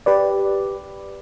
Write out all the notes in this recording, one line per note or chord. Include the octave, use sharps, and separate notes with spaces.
G4 B4 D5